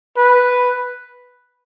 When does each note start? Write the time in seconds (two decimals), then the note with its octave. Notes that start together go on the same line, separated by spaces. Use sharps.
0.17 B4